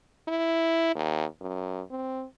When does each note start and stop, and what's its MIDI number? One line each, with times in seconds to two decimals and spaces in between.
0.28 0.95 64
0.95 1.25 39
1.41 1.82 42
1.90 2.25 60